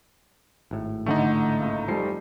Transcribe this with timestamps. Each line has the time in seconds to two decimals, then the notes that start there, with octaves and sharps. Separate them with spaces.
0.71 G#1 A2
1.06 A1 D3 A3 D#4 F#5
1.60 C#2 A#3
1.88 F1 F3 G3 C7